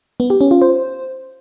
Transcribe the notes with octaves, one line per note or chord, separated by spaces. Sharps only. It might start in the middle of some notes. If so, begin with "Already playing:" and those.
B3
G4
C#4
F4
C5